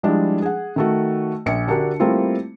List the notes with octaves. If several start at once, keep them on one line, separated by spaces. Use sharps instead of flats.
F3 G3 G#3 D4 E4
G#4 F#5
D#3 A3 F#4
A#1 C#7
D3 D4 F#4 G4 A#4
G3 A3 A#3 C4 E4 F4